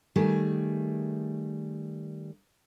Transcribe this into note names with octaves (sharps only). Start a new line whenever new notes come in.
D#3 G3 A3 G#4